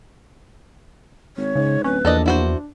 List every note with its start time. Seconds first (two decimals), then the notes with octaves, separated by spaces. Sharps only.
1.37 G#1 C#5
1.56 G#2 C#3
1.84 D1 C#4 B4
2.05 A#1 E2 A4 D5 D#5
2.26 D4 E4 F#4 C5